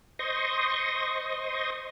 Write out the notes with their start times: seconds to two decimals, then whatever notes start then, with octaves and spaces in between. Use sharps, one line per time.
0.19 C5 D#5 C6 C#6 D#6